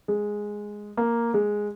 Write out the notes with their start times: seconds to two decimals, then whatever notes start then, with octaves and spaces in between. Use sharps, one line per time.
0.08 G#3
0.97 A#3
1.34 G#3